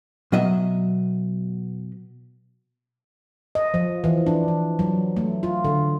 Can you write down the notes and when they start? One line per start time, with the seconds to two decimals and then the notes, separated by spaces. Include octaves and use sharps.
0.32 B2 F#3 D#5 E5
3.55 D#5
3.74 F3
4.04 E3
4.27 D4
4.48 E3
4.79 F#3
5.16 A3
5.43 F4
5.64 D3